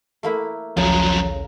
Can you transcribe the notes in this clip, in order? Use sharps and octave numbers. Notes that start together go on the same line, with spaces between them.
A3 A#3 E4
A#1 D#2 C#3 F3 F#3 A#5